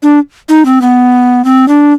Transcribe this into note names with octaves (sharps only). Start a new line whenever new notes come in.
D4
D#4
C4
B3
C4
D4